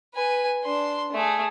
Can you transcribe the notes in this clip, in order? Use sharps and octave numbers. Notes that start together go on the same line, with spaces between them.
B4 G#5
D4 C6
A3 G#4